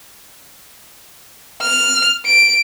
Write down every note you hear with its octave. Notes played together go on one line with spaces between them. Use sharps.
F6
D7